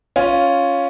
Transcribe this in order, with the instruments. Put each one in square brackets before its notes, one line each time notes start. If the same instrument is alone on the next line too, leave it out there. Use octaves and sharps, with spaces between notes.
[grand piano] C#4 F4